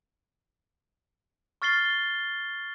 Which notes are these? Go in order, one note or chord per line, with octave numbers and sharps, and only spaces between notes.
C#6 F6 A6 C7 G7